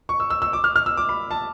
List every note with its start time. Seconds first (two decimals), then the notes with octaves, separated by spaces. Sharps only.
0.09 C#6
0.20 E6
0.30 E6
0.42 E6
0.53 D6
0.64 F6
0.76 F6
0.86 E6
0.97 D6
1.09 B5
1.31 A5